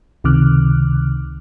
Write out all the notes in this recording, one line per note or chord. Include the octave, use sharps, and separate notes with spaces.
C#2 C3 D#3 D6 F6 F#6